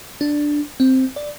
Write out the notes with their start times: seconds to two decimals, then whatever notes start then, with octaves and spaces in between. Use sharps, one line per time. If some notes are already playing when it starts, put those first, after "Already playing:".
0.21 D4
0.80 C4
1.16 D5